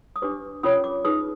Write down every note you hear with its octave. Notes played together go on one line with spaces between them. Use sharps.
D#6
D4 G4 B4 D6
C#4 F4 A#4 C#5 D#6
D6
D#4 G#4 B4 D#6